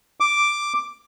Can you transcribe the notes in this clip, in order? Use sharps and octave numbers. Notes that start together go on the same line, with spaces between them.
D6